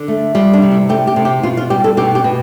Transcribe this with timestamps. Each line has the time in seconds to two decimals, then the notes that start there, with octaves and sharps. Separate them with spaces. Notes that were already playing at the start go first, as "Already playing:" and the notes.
Already playing: D3
0.08 A3
0.35 G3 F4
0.53 D4
0.62 C3
0.71 E4
0.89 A3 G4
1.07 G4
1.16 C3
1.25 G4
1.43 B2 F4
1.57 F4
1.70 G3 G4
1.84 A4
1.97 B2 G4
2.15 G4
2.24 B2